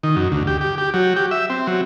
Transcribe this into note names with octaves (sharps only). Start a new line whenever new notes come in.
D#3
F#2
D2
G4
G4
G4
F#3
G4
E5
C4
F#3